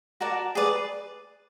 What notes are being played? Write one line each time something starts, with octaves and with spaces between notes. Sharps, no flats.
F#4 A#4 D5 A5
G#4 B4 D5